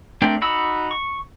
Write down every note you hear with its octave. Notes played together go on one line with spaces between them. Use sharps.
A3 C4 D4 A#4 G5
D#4 F#4 B5 E6
C#6